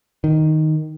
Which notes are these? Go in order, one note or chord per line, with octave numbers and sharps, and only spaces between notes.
D#3